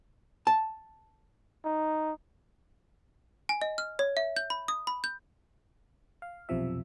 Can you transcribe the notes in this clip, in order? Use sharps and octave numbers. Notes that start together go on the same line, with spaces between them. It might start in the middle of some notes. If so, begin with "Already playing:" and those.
A5
D#4
G#5
D#5
F6
C#5
E5
G6
B5
D#6
B5
G6
F5
B1 F2 C3 F3 E5